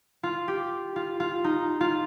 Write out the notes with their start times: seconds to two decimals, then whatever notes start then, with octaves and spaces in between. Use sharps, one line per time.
0.23 F4
0.48 G4
0.96 F4
1.20 F4
1.44 D#4
1.80 F4